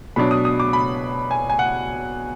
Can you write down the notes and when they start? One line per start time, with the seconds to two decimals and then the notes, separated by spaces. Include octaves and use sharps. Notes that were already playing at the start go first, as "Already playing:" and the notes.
0.16 B2 F#3 D4 B5
0.31 D#6
0.45 D#6
0.60 D6
0.73 B5
1.31 G#5
1.50 G#5
1.59 F#5